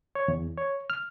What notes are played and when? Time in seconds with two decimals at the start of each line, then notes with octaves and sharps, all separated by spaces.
0.15 C#5
0.28 E2
0.57 C#5
0.90 F6